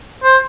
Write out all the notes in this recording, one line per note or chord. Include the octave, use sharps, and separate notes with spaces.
C5